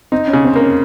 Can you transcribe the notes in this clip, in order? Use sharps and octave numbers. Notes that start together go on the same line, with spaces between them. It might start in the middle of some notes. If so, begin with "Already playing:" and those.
C4 D#4
C#4
C#3
C4
A#3
C#4